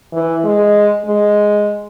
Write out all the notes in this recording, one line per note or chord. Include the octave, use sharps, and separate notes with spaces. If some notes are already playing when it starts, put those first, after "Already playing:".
E3
G#3
G#3